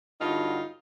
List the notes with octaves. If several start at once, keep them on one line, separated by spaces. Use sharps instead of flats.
G2 D3 F#3 D#4 F4